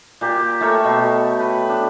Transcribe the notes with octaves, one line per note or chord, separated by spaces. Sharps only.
A#2 G4
A3 A4 A#4 C#5
B2
B4
D4